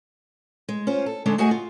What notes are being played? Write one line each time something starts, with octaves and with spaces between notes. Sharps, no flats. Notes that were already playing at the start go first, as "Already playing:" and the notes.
G#3
C#4 F4 C5
A4
D3 G#3 C#4 D4 A4
A3 F#4 G#4 D#5 F#5 G#5
F4